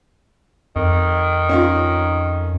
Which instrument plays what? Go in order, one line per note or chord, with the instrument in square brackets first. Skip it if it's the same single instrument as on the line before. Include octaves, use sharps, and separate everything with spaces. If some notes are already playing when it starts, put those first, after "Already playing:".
[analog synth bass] F2 [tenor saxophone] D#3
[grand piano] C#4 D#4 F4